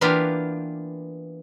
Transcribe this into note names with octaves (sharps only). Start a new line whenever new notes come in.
E3 A#3 B3 D4 F4 G4